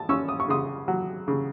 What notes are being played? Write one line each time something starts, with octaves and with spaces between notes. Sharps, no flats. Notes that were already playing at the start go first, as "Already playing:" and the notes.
Already playing: A5
C#4 C#6 E6
D#6
C#6
C#3 C6 D#6
F#3
C#3